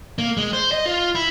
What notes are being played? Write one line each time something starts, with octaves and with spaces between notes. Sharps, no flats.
A#3
G#3
C5
D#5
F4
E4